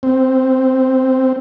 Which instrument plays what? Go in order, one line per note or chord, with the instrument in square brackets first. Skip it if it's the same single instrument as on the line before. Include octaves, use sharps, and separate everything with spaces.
[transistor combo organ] C4